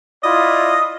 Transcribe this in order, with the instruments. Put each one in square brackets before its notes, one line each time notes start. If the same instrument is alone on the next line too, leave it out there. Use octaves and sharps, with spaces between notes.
[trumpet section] E4 F4 D5 [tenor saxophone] D#5